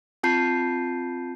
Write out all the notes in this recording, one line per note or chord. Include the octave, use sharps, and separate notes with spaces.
C4 F4 A5 G6 C7